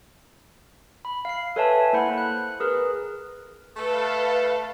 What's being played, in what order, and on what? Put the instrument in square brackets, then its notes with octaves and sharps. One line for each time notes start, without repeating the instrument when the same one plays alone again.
[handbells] B5
F5 C7
A4 B4 C#5 E5 G#5 A5
A#3 E4 C5 F#5 B5
F#6
G#4 A#4 B4
[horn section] A3 A4 [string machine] B4 F5